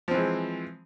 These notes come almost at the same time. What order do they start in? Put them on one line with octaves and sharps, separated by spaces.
F3 C4 E3 G#3